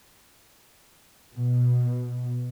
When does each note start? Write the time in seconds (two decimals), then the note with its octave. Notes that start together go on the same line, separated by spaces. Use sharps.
1.33 B2